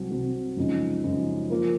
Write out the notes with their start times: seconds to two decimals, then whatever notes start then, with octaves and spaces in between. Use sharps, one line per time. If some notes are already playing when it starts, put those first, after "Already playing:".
Already playing: C2 C3 F#3 C4
0.11 C2 C3 F#3 C4
0.57 F#2 C#3 F3 G#3 D#4
1.04 F#2 C#3 F3 G#3 D#4
1.50 F3 A#3 F4 A#4